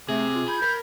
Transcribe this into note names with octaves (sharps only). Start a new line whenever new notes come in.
C3 A3 G#4
F4
B5 G6 G#6
A#4 B5